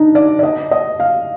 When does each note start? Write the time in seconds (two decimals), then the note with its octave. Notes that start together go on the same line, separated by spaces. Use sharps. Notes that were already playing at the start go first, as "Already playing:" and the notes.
Already playing: D4 D#4
0.15 D5
0.39 D5
0.43 D#5
0.71 D#5
1.00 F5